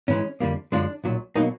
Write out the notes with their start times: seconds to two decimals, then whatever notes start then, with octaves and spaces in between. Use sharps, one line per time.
0.08 G#2 E3 G#3 C#4
0.40 F2 D3 G3 A#3
0.72 F#2 D3 F3 G#3 D4
1.04 B1 A#2 F#3
1.36 B2 F#3 A#3 D#4